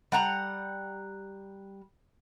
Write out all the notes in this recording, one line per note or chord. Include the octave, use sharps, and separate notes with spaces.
G3 F#5 A#5